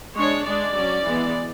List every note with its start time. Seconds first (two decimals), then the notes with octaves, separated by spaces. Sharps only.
0.16 G#3 D4 C#5
0.46 G#3 D4 D5
0.75 F#3 C#4
1.04 E3 G#3 B3